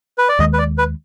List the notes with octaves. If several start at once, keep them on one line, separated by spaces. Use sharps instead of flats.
B4
D5
D#2 D#3 G#3 D#5
B4
D5
B4